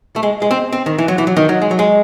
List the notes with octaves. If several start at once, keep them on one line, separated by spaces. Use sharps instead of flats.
A3
G#3
G#3
C4
C4
D#3
E3
F#3
E3
F#3
D#3
F#3
G#3
F#3
G#3